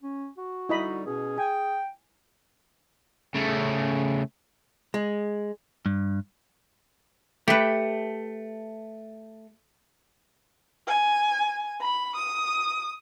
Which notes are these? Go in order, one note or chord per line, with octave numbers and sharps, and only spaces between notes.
C#4
F#4
D3 G3 D#4 E4 D#5 B5
B2 C#4 G#4
G5 G#5
C#3 A3
G#3
G2
A3 G4 B4
G#5
B5
D#6